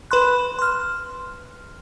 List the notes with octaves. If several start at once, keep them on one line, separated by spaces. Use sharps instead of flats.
B4 B5 C6 F#6
C6 F6